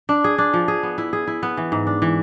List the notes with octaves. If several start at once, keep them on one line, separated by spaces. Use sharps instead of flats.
D4
G#4
D4
F3
G#4
B3
E4
G#4
E4
B3
E3
G#2
D4
E3